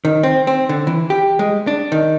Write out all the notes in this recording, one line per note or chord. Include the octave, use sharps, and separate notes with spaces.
D#3
C4
C4
D3
E3
G4
G#3
D4
D#3